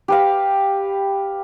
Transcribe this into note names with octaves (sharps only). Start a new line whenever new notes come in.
G4 B4 F5